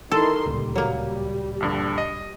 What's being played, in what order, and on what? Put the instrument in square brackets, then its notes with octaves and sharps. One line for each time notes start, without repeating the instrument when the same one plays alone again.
[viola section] D#3 E3 C6 [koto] A4
[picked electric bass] D1 C#2 A#2 [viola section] G3
[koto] F#3 A#3
[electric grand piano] A#1 G2 D3
D#5